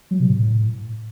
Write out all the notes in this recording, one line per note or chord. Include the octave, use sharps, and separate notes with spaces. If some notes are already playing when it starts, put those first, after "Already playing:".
F#3
C3
A2